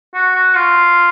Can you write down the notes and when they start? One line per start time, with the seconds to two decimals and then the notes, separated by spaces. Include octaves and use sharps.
0.15 F#4
0.35 F#4
0.55 F4